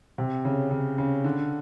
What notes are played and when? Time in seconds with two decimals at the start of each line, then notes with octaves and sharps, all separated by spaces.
0.18 C3
0.45 C#3
0.71 C#3
0.98 C#3
1.24 D3